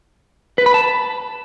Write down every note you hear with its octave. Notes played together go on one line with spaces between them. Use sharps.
B4
B5
A5